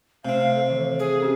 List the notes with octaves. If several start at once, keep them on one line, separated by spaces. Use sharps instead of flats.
C3 A3 C4 F5
A4
D#3 E3
G#4
C#4 G4 G#4